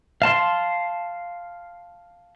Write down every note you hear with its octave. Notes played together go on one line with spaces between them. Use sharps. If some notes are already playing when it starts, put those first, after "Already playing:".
F5 A5 C6